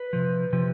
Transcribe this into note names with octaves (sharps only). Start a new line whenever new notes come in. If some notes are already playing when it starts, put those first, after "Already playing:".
Already playing: B4
C3 F3
C3 F3